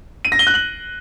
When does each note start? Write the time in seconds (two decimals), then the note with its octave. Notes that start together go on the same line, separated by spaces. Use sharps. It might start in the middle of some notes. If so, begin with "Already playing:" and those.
0.25 D#7
0.32 A#6
0.39 G7
0.47 F#6
0.54 F#7